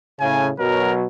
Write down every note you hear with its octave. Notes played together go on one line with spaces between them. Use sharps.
A2 C#3 G#5
B2 F#3 A#4